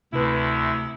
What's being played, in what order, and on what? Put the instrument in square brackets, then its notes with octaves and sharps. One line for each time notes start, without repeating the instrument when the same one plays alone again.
[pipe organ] D2 [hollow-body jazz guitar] C3 B4 [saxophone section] E4